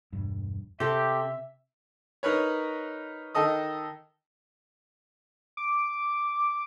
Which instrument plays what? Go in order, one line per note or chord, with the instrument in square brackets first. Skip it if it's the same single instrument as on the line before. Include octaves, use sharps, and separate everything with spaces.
[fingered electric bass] E1 G2
[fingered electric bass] C3 [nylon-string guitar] C4 A4 [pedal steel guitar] G4 [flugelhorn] E5
[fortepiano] D#4 A#4 B4 C#5
D#3 A4 D#5 D#6
[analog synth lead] D6